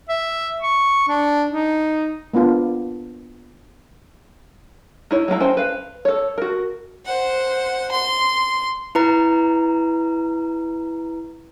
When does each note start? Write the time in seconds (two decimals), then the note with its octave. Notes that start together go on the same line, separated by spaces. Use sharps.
0.09 E5
0.61 C#6
1.08 D4
1.51 D#4
2.34 A#3 B3 D4 F4
5.11 D#4 E4 C#5
5.28 F#3 A#3 E4 A#5
5.40 C#4 C5 G5
5.57 B4 F5
6.05 A4 C#5
6.38 F#4 A#4
7.06 C5 F#5
7.92 C6
8.95 E4 B4 A#5